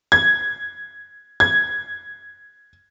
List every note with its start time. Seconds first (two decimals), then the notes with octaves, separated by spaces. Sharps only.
0.12 G#6
1.40 G#6